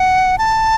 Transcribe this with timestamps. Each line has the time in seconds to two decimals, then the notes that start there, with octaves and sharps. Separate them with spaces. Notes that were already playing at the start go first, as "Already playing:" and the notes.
Already playing: F#5
0.38 A5